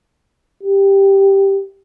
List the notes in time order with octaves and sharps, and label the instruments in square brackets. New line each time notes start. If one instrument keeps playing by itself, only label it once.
[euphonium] G4